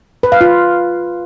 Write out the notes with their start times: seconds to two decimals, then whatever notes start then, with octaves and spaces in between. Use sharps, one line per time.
0.23 B4
0.32 F5
0.41 F4